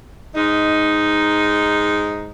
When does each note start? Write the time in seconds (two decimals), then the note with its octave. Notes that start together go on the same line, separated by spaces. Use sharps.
0.35 G#2 D#4